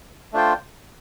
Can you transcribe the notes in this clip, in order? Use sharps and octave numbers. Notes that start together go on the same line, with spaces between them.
A3 D4 F4 C5 G5